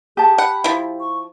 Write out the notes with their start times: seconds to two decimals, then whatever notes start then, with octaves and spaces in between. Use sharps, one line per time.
0.17 G4 G#4 A5
0.38 F#5 B5
0.64 F3 E4
1.00 C#6